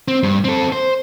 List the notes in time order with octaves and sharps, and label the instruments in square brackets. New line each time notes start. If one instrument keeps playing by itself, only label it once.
[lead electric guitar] C4
G2
C4 A4
C5